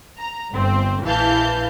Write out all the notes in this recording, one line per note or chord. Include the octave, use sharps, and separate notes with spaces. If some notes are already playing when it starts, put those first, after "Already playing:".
A#5
G1 C4
A#1 E3 F5 A5 G6